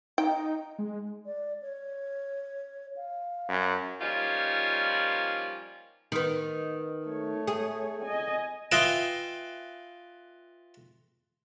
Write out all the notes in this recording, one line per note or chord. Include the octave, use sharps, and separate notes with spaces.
D#4 G5
G#3
D5
C#5
F5
F#2
F3 G3 A#3 C#4 D#4 F4
D#3 B3
A3 C#5
G#4
D#5 G#5
F4 B4 D#5 E5 G5 G#5